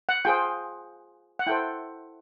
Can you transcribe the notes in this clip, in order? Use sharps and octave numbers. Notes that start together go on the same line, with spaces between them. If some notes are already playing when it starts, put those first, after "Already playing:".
F#5
F4 G#4 C5 G5
F#5
E4 A4 C5 G5